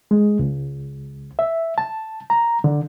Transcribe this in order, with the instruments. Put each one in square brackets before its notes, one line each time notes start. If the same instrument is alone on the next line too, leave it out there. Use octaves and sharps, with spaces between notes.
[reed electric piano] G#3
C#2
E5
A5
A#5
D3